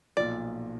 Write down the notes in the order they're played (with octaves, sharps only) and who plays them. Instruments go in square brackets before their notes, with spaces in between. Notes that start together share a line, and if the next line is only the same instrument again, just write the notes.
[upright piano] B1 A#2 F3 [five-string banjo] D5